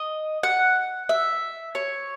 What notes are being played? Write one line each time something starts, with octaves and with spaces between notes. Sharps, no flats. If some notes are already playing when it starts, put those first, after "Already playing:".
Already playing: D#5
F#5
E5
C#5